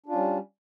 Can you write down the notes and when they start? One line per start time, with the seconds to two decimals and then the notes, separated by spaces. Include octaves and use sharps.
0.06 D4
0.09 F4
0.12 C#4
0.15 G3